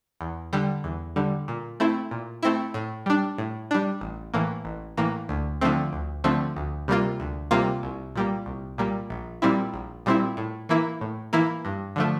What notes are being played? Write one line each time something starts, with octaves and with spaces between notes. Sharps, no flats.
E2
D3 G3
E2
D3 G3
A#2
A3 C4 E4
A#2
A3 C4 E4
A2
G3 D4
A2
G3 D4
A1
A2 E3 A#3
A1
A2 E3 A#3
D2
D3 F3 A3 C4
D2
D3 F3 A3 C4
D2
C3 G3 A#3 F4
D2
C3 G3 A#3 F4
C2
A#2 G3 A#3
C2
A#2 G3 A#3
A#1
A#2 G3 C4 E4
A#1
A#2 G3 C4 E4
A2
E3 A#3 E4
A2
E3 A#3 E4
G2
D3 F3 A3